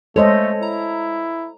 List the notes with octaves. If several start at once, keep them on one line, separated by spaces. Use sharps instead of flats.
G#3 A3 A4 C5 C#5 D#5
E4 A#5